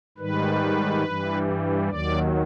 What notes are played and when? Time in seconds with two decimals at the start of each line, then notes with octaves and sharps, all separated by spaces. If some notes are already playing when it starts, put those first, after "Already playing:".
0.18 G#2 D#3 G3 B4
1.03 G2 E3 G3
1.89 D#2 D#3 F#3 D5